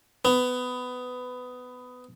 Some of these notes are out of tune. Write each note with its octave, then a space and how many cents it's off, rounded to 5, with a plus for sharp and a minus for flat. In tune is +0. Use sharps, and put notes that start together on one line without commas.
B3 +20